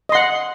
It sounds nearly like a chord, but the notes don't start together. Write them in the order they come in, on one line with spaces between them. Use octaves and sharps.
D#5 C6 F#5